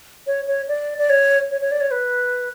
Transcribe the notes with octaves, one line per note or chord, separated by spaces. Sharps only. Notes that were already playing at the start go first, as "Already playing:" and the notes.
C#5
C#5
D5
D5
C#5
C#5
C#5
D5
C#5
B4